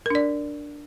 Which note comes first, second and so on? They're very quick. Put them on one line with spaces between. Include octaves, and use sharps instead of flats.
A#4 D4 D5